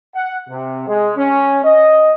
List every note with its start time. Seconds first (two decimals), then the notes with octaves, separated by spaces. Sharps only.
0.15 F#5
0.49 C3
0.87 G#3
1.17 C#4
1.65 D#5